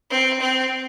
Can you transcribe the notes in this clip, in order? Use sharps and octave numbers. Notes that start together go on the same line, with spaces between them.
C4
C4